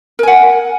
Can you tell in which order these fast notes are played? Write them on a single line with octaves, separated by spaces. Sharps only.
A#4 G#5 F#5